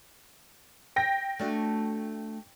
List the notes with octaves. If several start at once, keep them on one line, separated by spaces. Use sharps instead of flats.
G5 A#6
A3 D4 F#4